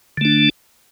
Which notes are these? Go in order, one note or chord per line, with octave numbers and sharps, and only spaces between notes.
D3 A3 D4